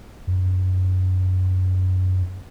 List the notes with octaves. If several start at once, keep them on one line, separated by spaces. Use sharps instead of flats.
F#2